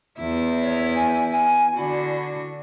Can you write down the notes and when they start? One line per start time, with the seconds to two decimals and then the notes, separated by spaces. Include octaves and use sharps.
0.18 E2 E4
0.61 C#5
0.94 G#5
1.31 G#5
1.76 D3 D4 E4 F#4